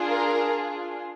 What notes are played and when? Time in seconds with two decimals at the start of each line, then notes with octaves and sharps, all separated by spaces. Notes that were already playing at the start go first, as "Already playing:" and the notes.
Already playing: D4 F4 G#4
0.09 A#4